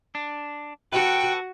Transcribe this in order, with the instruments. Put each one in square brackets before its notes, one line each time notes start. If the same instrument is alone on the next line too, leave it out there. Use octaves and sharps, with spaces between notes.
[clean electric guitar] D4
[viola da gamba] F#4 [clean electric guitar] A4 B4 [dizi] G5